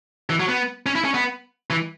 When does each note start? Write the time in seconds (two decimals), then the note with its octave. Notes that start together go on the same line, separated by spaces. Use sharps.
0.30 E3
0.40 F#3
0.49 B3
0.86 C#4
0.95 E4
1.04 C#4
1.14 B3
1.70 E3